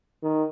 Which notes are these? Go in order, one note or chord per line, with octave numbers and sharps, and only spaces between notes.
D#3